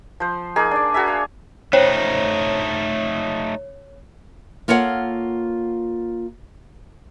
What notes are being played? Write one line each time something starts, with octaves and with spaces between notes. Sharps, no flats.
F3 C5
A#3 D#4 G#4
D4 D5
F#4 G#4 A#4 E5
F5
A3 C#4 D#4 C5 C#5
A#3 F4 A4 C#5 E5 F#5